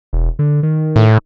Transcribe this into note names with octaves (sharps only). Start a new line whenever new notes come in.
E1
D3
D#3
A2